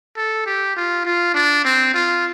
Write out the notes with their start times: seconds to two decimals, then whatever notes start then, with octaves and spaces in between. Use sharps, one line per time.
0.16 A4
0.46 G4
0.76 F4
1.05 F4
1.34 D4
1.65 C4
1.94 F4